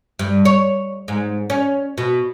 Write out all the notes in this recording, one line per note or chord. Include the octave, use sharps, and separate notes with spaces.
G2
C#5
G#2
C#4
B2